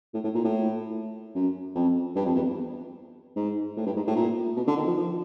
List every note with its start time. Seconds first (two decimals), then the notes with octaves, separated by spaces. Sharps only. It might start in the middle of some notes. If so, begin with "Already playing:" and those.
0.14 A2
0.24 A2
0.35 A#2
0.44 A2
1.35 F#2
1.75 F2
2.16 G2
2.25 F2
2.35 E2
3.36 G#2
3.77 A2
3.86 G2
3.96 G#2
4.07 A2
4.16 A#2
4.56 B2
4.67 D3
4.77 D#3
4.87 F3
4.97 F3